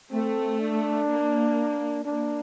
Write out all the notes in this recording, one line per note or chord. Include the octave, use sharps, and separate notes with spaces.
A3 C4
D4
A#3
A#3 D4